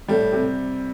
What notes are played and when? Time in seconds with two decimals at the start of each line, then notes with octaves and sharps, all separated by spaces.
0.08 A2 G3
0.32 C3